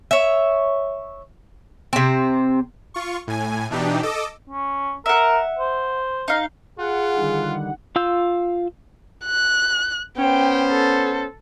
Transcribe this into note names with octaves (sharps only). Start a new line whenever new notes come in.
C#5 E5
C3 C4
F4 C#6
A2 G#5
B2 E3 D4 D#4 G4
A4 D#5 D6 E6
C#4
A#4 E5 F#5
C5
D#4 F5
F4 G#4 F#5
D3 D#3 G3
F4 F5 E6 G6
F#6
B3 C#4 C5 G5
A4